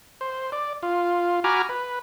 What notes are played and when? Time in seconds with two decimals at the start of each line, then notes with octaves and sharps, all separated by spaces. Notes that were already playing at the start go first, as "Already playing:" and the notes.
0.21 C5
0.52 D5
0.83 F4
1.44 F#4 G#5 A#5 B5 D6 F6
1.69 B4